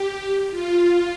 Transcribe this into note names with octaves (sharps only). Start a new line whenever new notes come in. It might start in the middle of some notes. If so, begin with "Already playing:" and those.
Already playing: G4
F4